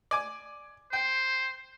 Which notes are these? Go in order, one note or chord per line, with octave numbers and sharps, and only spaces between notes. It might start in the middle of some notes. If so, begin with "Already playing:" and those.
D5 G#5 D6
C5 G5